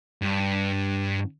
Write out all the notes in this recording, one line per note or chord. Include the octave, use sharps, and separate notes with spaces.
G2